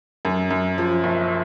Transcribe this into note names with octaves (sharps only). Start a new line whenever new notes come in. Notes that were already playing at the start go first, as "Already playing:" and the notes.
F#2
F#2
F3
F#1